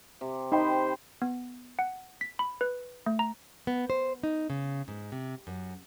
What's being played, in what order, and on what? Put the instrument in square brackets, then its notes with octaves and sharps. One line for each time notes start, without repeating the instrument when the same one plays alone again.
[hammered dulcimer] C3
[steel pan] D#4 [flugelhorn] C5 [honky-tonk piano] G5 B5
[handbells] B3
F#5
B6
B5
B4
A3
A#5
[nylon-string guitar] B3
C5
D#4
C#3
G#2
C3
F#2